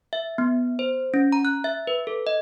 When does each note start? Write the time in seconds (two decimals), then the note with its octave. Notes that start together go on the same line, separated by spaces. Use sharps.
0.13 E5
0.38 B3
0.79 C5
1.14 C#4
1.32 A#5
1.45 F#6
1.64 E5
1.87 B4
2.07 A4
2.27 D#5